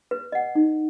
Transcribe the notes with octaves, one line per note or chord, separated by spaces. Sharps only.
B4
D#5 F#5
D#4